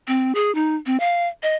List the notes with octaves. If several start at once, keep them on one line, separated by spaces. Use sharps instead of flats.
C4
G#4
D#4
C4
F5
D#5